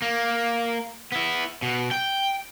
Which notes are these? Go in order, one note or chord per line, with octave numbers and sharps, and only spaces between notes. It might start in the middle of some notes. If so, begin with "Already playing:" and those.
A#3
B3 E4
B2
G5